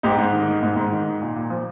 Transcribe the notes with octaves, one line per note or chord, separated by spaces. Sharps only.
G#2 D#4 G4
G#2
D#3
D#3
G#2
G#2
D#3
D#3
A#2
A#2
F3